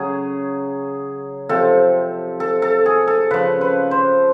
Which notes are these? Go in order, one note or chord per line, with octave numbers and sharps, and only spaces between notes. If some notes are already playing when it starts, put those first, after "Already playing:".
Already playing: C#3 F#3 G#4
C3 F3 A4
A4
A4
G#4
A4
C#3 F3 B4
B4
C5